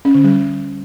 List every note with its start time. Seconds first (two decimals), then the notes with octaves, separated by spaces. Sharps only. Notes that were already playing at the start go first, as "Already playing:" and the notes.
0.05 C#4
0.15 D3
0.24 G3